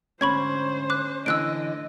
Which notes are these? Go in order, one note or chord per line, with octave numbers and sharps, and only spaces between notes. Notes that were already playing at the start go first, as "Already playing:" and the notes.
D2 G#2 C#4 C5 B5 C#6 G#6
D6 F#6
A2 D3 E3 D#5 E6 F#6 D7